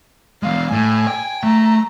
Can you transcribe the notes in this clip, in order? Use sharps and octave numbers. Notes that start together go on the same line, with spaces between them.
E3 G#3 F5
A2 G#5
G5
A3 A#5